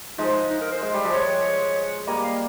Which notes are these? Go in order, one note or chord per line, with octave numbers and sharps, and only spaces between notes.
F3 G#3 D#4
D#4
A#4
C5
G#3
G3
F3 G#3
C#5
G3 A#3 D#5
F5